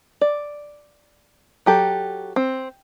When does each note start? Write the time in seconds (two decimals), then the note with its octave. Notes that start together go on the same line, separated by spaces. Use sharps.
0.21 D5
1.66 F#3 G4 A4
2.36 C4